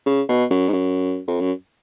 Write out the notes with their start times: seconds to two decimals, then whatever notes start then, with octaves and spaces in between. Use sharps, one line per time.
0.06 C#3
0.29 B2
0.50 F#2
0.69 G#2
0.73 F#2
1.28 F2
1.40 F#2